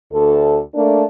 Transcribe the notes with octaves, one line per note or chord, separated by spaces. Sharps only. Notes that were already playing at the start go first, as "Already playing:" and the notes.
D2 A4
A3 A#3 D4